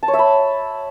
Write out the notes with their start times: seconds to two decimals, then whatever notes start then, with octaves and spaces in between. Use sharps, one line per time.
0.03 A5
0.08 C#5
0.13 E5
0.19 B5